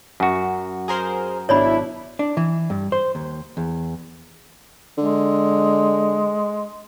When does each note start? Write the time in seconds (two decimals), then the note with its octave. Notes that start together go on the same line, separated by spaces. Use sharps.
0.20 F#2 F#4
0.88 G#4 A#4 C5
1.49 G#1 B2 D4 E4 C#5 D5 B5
2.19 D4
2.37 E3
2.70 G2
2.92 C5
3.15 D#2
3.57 E2
4.98 D3 G#3